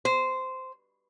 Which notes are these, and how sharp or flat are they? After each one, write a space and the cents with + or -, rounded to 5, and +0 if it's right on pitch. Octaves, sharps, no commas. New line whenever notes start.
C5 -10